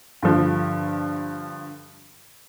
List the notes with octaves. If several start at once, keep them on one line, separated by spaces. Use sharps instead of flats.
G2 D3 F3